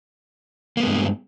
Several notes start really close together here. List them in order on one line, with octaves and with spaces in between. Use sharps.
A#3 B3 G#3 G2